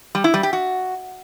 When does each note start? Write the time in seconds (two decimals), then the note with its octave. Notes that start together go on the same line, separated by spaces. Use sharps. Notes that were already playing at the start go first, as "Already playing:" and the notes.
0.15 G3
0.24 E4
0.34 G3
0.43 G4
0.53 F#4